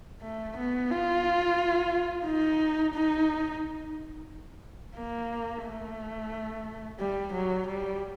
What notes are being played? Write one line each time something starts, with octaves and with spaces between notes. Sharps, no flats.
A3
B3
F4
D#4
D#4
A#3
A3
G3
F#3
G3